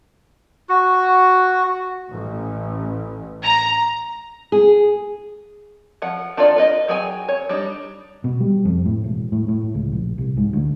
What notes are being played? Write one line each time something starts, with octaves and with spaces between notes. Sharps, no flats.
F#4
A1
A#5
G#4
F3 F#5
D4 D#4 F4 A4 D5
F4 B4 D#5
F#3 G#4 G5 G#5
C#5
G3 D4 D#4
B2
G3
F2
A2
E1
A2
A2
C#2
A#1
C2
G#2
D2